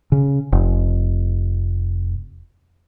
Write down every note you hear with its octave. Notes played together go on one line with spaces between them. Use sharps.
C#3
F1